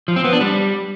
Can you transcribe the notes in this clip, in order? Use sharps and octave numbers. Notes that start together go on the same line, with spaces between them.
F3
C4
B3
D4
G3